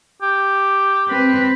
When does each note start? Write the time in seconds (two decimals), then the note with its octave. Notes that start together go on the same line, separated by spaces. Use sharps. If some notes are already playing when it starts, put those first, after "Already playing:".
0.22 G4
1.08 C4 B4